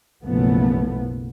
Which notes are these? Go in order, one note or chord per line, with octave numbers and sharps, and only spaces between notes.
F#1 B1 B2 F3 A3 B3